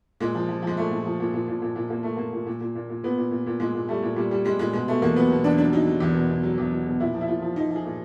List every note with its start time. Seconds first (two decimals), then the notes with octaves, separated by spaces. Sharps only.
0.20 A#2 G#3
0.35 F3
0.49 F3
0.62 F3 G#3
0.77 A#2 A3
0.91 A#2
1.05 F3
1.20 A#2
1.34 A#2
1.48 A#2
1.62 A#2
1.76 A#2
1.90 A#2 A#3
2.03 A#2 A3
2.17 A#2 A#3
2.33 A#2
2.46 A#2
2.61 A#2
2.75 A#2
2.89 A#2
3.03 A#2 B3
3.17 A#2
3.31 A#2
3.46 A#2
3.60 A#2 G#3
3.75 A#2
3.88 G3 A3
4.02 A#2
4.16 A#2 G3
4.31 G3
4.45 G3 G#3
4.59 A#2 G#3
4.73 B2 G#3
4.88 B2 A3
5.02 E2 A#3
5.16 F#3 B3
5.30 B2
5.44 E2 D4
5.58 F#3 D4
5.73 F#3 D#4
5.87 F#3
6.00 E2
6.15 B2
6.29 B2
6.43 F#3
6.58 E2
6.71 F#3
6.86 B2
7.00 A#2 E4
7.14 F3
7.21 E4
7.28 A#2 F4
7.42 F3
7.56 F3 D#4
7.71 F3 G#4
7.85 A#2